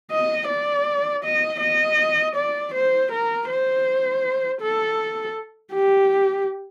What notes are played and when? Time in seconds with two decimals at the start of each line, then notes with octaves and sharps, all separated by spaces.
0.11 D#5
0.48 D5
1.24 D#5
1.60 D#5
2.35 D5
2.74 C5
3.11 A#4
3.49 C5
4.61 A4
5.74 G4